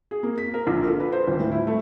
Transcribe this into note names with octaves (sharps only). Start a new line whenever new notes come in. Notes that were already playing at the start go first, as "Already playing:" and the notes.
G#4
A#3
B6
A#4
A#1
A4
B4
C5
D#1
A2
E4
A3